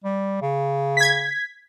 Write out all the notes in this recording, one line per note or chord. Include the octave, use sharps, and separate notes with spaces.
G3
C#3
G#6 B6